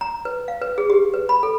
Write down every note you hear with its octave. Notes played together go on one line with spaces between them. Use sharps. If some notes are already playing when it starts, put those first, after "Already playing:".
A#5
B4
F5
B4
G#4
G4
B4
B5
A4